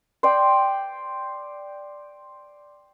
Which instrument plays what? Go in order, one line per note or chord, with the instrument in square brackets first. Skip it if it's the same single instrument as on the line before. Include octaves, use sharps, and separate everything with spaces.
[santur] C5 D5 G5